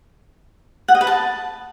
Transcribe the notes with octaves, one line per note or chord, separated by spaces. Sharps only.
F#5
D#5
B4
A5